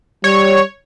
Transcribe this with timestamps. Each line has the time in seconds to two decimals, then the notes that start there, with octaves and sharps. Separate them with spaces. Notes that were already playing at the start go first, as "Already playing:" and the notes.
0.24 G3 C#5